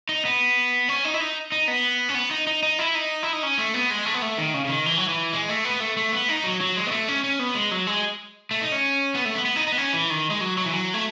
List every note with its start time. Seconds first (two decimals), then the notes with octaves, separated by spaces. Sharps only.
0.09 D#4
0.25 B3
0.89 C#4
1.05 D#4
1.14 E4
1.20 D#4
1.52 D#4
1.68 B3
2.09 C#4
2.15 B3
2.31 D#4
2.47 D#4
2.63 D#4
2.79 E4
2.95 D#4
3.23 E4
3.33 D#4
3.43 C#4
3.58 A3
3.74 B3
3.91 G#3
4.05 A3
4.14 B3
4.22 A3
4.38 D#3
4.54 C#3
4.65 C#3
4.69 D#3
4.86 E3
4.97 F#3
5.08 E3
5.33 G#3
5.49 A3
5.64 B3
5.80 A3
5.97 A3
6.12 B3
6.29 D#4
6.44 F#3
6.60 F#3
6.76 G#3
6.87 B3
6.92 A3
7.08 C#4
7.24 C#4
7.39 B3
7.55 G#3
7.71 F#3
7.87 G#3
8.51 A3
8.61 D#4
8.72 C#4
9.15 B3
9.25 A3
9.35 B3
9.45 B3
9.56 D#4
9.67 D#4
9.72 B3
9.78 C#4
9.93 E3
10.10 D#3
10.31 G#3
10.41 F#3
10.57 F#3
10.66 E3
10.73 F#3
10.94 A3